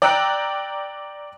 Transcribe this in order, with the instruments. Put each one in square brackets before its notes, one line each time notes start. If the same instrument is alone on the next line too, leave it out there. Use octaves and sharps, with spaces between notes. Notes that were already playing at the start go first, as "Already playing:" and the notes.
[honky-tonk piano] D5 G5 A#5 E6 F#6 D7